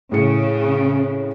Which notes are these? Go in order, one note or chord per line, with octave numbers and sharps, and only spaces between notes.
A2 C#3 G#4 C#7